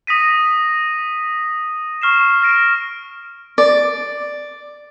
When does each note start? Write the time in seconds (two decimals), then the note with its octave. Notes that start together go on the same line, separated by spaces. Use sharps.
0.07 D#6 A#6 B6 D#7
2.02 C#6 F6 C7 E7
2.42 F6 A#6 D7
3.58 D5